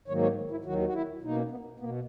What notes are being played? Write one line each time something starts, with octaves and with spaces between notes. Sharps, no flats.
G#2 D#3 F#3 A#3 C#5
C#5
E4
D#2 D#3 F#3 F#4
F#4
E4
B2 A#3 D#4
C#4
B3
B2 A#3 B3